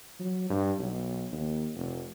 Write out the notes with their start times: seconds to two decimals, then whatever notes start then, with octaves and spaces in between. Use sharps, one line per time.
0.19 F#3
0.50 G2
0.79 B1
1.32 D#2
1.74 F1